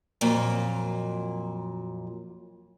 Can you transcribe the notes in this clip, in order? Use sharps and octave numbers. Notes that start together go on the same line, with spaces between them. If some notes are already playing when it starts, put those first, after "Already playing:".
F2 A#2 F#3